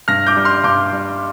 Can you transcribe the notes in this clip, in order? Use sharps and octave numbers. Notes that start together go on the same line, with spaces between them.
G2 F6 A#6
D6 G6
G3
C6 F6
G2 D6 G6
G3